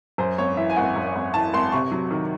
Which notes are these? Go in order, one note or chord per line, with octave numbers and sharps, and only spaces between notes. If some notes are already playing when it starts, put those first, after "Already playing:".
F#2 C5
G#1 C#5
E3 E5
G#5
G#1 F#5
F#2
G#1
E3 A5
G#1 C6
C3 C#6
F#3
D#3